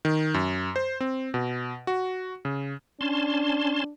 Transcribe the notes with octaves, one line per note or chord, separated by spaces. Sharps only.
D#3
F#2
C5
C4
B2
F#4
C#3
C#4 D4 A5 C6